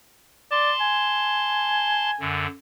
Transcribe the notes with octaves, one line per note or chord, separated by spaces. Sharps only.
D5 A5 C6
G#5
F#2 D3